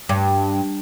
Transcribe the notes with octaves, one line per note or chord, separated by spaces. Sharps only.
G2